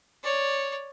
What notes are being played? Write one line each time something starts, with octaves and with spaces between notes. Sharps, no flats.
C#5 D5